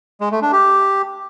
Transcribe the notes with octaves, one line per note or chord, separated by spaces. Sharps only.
G#3
A3
D4
G4